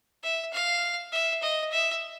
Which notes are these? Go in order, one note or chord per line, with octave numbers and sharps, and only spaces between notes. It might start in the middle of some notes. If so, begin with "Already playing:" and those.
E5
F5
E5
D#5
E5